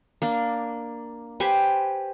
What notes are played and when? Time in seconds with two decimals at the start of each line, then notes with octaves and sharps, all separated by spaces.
0.22 A#3 D4
1.40 G4 B4 C5 G#5